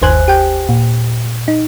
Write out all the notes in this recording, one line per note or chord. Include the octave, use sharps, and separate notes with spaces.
G1 D#2 C5 G#5 F#6
G4 G5
A#2
D#4